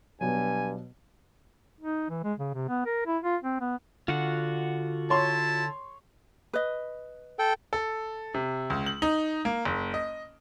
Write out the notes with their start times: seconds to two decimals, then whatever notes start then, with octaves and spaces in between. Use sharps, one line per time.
0.21 G2 B2 F#3 G#5
1.81 D#4
2.09 E3
2.24 G#3
2.39 C#3
2.54 C3
2.69 B3
2.86 A#4
3.06 E4
3.24 F4
3.44 C4
3.61 B3
4.08 D3 F4 F#4 F#5
5.10 E4 C#5 A5 C6
6.53 B4 D#5
7.39 A4 G5
7.73 A4
8.34 C3
8.70 C#2
8.86 F#7
9.02 D#4
9.45 A#3
9.65 F#1
9.94 D#5